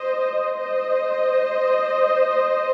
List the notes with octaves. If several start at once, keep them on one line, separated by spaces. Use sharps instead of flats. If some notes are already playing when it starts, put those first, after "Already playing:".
Already playing: C5 D#5
C5 D#5